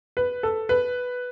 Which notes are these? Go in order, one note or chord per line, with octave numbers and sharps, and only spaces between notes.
B4
A4
B4